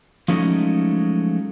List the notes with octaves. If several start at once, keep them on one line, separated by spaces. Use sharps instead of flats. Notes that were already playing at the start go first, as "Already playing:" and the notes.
F3 F#3 G#3 A3 C#4 D#4